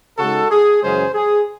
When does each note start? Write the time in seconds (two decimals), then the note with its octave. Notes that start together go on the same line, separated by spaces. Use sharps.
0.19 C#3 G#3 D#4 F#4 A4
0.51 G#4
0.82 F#2 C#3 E3 G#3 C#4 G#4 C5
1.14 G#4